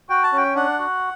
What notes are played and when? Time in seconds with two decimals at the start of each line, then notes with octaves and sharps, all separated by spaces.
0.09 F#4 G5
0.23 A5
0.32 C#4 G5
0.55 D4 F#5
0.79 F#4